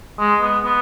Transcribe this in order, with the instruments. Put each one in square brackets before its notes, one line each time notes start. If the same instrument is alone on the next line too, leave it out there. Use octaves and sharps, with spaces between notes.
[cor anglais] G#3
B3
B3